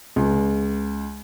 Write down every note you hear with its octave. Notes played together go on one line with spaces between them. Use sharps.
C#2